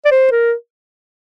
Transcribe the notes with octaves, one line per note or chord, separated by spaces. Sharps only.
D5
C5
A#4